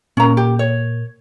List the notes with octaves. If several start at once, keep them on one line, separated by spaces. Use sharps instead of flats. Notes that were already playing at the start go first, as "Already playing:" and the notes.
A#2 A#3 C#4 A#5
G4
C#5